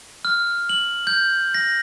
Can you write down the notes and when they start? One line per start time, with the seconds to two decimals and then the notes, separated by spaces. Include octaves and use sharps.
0.25 F6
0.69 F#7
1.07 G6
1.54 A#6